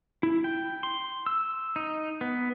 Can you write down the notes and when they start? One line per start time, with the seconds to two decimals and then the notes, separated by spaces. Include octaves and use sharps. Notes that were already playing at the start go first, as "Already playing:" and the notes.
0.23 E4
0.44 G5
0.83 C6
1.26 E6
1.76 D#4
2.21 B3